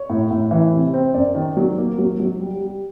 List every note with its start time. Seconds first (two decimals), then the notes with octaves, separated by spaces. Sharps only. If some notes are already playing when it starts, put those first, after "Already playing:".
Already playing: C#5
0.10 A2
0.31 A2
0.51 E3
0.72 C3
0.94 C4
1.14 F#2 D5
1.35 D#3
1.57 F#3
1.78 A#3
1.98 F#3
2.20 F#3
2.40 G3
2.61 G3